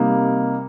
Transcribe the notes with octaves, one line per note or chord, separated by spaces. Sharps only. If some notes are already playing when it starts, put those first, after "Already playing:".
Already playing: C3 G3 A#3 D#4